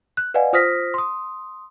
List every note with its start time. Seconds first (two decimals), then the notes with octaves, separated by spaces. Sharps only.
0.17 F#6
0.34 B4 D5 D#5 F5 F#5 G#5
0.53 F4 C5 D#6 F6 A#6 B6
0.94 C6 D#6